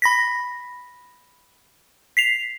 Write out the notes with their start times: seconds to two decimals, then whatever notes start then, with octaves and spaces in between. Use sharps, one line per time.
0.02 B5 A#6 B6
2.17 B6 C7 F7